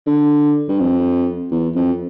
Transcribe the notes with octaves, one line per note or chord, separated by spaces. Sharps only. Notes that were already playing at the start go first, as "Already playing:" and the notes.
D3
G2
F2
E2
F2